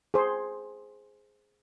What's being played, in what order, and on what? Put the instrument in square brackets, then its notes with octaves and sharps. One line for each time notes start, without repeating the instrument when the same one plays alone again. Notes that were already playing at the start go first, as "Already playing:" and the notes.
[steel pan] G#4 C5